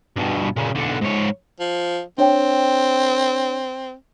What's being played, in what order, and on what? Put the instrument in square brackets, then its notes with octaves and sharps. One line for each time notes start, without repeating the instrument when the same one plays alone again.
[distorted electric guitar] G2 B2
A#2 C#3
B1 D3
G#2 C#5
[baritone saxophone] F3
[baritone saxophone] C4 [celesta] D4 C#5 G5